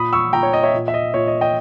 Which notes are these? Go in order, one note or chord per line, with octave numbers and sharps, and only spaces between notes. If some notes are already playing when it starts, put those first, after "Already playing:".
Already playing: A#2 B5 D#6
C#6 E6
A#2 G5 A#5
C#5
D#5
C#5 E5
A#2
E5
D#5
A#2 C#5
D#5
D#5 G5